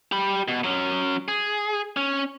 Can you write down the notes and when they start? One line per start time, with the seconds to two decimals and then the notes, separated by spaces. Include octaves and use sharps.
0.12 G4 B5
0.48 B2
0.64 F#3 C#4
1.28 G#4
1.97 C#4